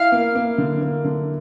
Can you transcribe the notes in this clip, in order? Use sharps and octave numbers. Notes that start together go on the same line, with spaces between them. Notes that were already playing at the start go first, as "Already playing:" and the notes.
Already playing: E4 F5
A#3
A#3
D3
A#3
D3